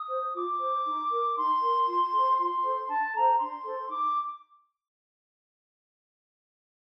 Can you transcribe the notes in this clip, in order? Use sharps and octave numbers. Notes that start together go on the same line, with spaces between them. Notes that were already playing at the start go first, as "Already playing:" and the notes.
Already playing: D#6
C5
F4 D6
C5
D#4
A#4
D#4 C6
A#4
F4
A4 C5
F4 C6
A4 C5
D4 A5
A4 C5 A#5
D4 C6
A4 C5
D#4 D6